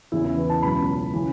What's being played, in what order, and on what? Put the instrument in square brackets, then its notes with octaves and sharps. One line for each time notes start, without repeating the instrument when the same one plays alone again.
[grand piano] E2 C#3 E3 E4
E4
B4
A5
C#2 B2 F#3 B5
C#3 E3